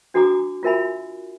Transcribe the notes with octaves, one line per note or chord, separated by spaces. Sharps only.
D4 F#4 A4 G#5 A#5 D6
F4 F#4 A#4 E5 G#5 B5